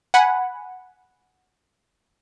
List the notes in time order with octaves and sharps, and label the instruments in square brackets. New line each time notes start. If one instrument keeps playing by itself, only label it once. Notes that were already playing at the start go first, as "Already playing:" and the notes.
[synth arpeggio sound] F#5 G#5 B5